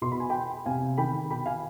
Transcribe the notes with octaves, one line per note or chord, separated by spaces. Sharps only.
B2 C6
B5
G#5
G5 B5
C3 F5 G#5
D#3 G5 B5
B2 G5 B5
F5 G#5